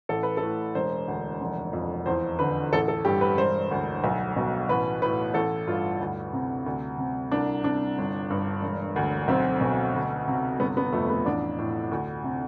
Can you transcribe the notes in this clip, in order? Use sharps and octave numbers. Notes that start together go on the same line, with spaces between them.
A1 A4
B4
A4
A2
E1 C5
D2
F1
F2
E2 C5
D3 B4
A1 A4
A4
G2 G4
B4
E1 C5
D2
B1
B2
A1 B4
A2 B4
A1 A4
G2 F4
D2
C3
D2
C3
C2 D4
C3 D4
G1
G2
E1
D2
B1 C4
B2
D2
C3
G1 B3
B3
F2 A3
B3
A1 D4
A2
D2
C3